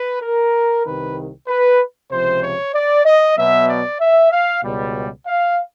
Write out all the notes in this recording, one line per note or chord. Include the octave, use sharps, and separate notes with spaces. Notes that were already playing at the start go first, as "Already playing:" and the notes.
Already playing: B4
A#4
C2 C3 D#3 B4
B4
C#2 C3 F3 C5
C#5
D5
D#5
B2 F#3 B3 E5
D5
E5
F5
C#2 B2 G3
F5